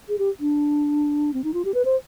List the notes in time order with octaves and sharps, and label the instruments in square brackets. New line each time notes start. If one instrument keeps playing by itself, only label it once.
[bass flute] G#4
G4
D4
C4
D#4
F4
G4
B4
C5